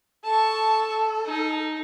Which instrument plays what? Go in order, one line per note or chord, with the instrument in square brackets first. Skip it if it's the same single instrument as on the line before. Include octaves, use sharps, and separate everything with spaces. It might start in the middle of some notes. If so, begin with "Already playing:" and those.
[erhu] A4 [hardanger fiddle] A5 C#6
[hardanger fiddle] D#4